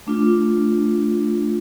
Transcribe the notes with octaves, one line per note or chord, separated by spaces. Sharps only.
A3 D4 F4